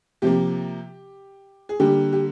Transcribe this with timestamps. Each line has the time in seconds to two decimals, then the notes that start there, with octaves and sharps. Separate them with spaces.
0.22 C3 F3 A#3 G4
1.69 G#4
1.80 D3 G3 A#3 G4
2.13 G4